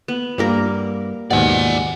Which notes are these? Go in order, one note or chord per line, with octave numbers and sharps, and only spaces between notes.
B3
G2 G3 A#3 A#4
D#2 G#2 B2 D5 F#5 G#5